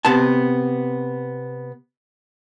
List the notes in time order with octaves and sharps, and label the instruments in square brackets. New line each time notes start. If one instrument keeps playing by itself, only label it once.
[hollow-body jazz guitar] C3 B3 A5